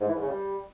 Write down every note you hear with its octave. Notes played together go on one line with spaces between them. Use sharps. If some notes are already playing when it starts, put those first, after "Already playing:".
G#2
E3
G#2
C#3
G3